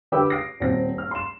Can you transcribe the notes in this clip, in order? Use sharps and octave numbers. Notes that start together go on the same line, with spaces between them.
D3 G4 B4 G5 D6 E6
D#6 A#6 C7 D7
D#1 C4 A#6
F6
C6 E7